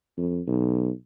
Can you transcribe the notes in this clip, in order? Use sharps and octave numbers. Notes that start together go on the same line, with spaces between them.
F2
B1